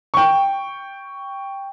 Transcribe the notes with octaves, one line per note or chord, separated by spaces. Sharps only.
G5 C#6